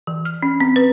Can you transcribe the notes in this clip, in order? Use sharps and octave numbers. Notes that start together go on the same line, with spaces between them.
E3
F6
C#4
C4
B4